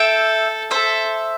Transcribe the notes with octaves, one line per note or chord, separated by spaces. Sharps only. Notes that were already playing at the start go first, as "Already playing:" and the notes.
Already playing: A4 E5 G5
A4 C5 E5